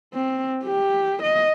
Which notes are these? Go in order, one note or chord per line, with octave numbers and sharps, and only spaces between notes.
C4
G4
D#5